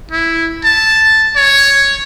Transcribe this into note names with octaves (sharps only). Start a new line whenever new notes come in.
E4
A5
C#5